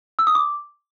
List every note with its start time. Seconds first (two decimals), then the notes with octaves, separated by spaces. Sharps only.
0.19 E6
0.27 D#6
0.35 D6